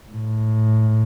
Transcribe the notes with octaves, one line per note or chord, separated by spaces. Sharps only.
A2